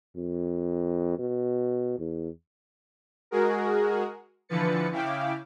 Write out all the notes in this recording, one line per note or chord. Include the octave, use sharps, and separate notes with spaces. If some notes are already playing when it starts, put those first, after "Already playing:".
F2
B2
E2
G#3 F#4 G#4 A#4
D3 E3 F3 B4 A6 C#7
C#3 E4 F5 G5 D6